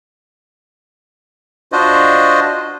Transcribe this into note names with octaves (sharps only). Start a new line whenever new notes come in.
D4 F4 F#4 C5 D#5